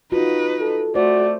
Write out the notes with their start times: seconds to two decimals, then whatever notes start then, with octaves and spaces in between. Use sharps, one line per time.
0.12 D#4 F4 F#4 B4
0.60 A4
0.95 A3 F#4 C5 D5